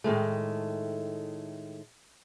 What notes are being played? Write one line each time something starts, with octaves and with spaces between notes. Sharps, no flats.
A2 D#3 G#3 A3